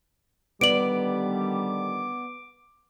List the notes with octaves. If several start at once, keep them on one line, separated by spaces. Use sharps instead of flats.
D3 D#3 G3 B3 D5 D6 D7 F#7